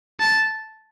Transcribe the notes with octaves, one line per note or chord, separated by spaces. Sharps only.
A5